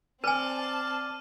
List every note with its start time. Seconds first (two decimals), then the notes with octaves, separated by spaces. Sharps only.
0.24 C4 B4 D5 G#5 A5 F6 D#7